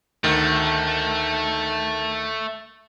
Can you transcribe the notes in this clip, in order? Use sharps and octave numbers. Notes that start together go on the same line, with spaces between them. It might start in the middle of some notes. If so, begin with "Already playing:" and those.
D2 D#3 A3